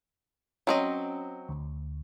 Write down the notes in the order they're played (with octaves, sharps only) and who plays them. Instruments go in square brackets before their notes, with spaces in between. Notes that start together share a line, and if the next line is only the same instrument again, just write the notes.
[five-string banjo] F#3 C4 D#5 [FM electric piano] C#4
[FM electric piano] D2